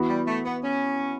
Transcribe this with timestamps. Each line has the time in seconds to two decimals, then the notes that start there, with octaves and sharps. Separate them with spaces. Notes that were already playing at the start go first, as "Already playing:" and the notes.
Already playing: E3 B3 F#4
0.09 G3
0.27 A3
0.45 B3
0.63 C#4